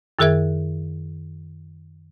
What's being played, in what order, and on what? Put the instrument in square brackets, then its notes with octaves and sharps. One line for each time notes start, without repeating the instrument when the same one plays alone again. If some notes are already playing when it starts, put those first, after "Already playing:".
[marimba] F#2 D#3 G#4 A#4 E5 G#6